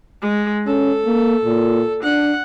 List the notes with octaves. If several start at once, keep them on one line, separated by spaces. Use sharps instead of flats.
G#3
C#4 A4
A#3
A#2
D4 F#5